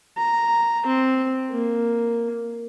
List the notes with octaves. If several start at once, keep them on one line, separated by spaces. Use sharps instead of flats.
A#5
C4
A#3